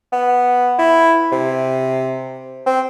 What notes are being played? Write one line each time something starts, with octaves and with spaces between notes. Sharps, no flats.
B3
E4
C3
C4